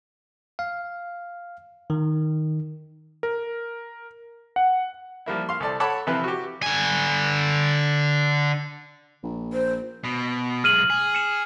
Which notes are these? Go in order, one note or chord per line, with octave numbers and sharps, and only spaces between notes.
F5
D#3
A#4
F#5
F3 G3 A#3 E4
F5 C6
C2 A4 D5 A5
A4 C#5 F#5 A5 B5 D6
C3 E3 F3 C4 E4 B4
F#4 G4
D3 G#5
A#1
C5
B2
B1 G#3 F6 D#7 F#7
G#4
C#7 E7